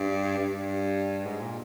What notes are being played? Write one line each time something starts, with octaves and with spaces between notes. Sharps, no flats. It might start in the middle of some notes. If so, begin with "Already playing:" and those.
Already playing: G2
G2
G#2
A#2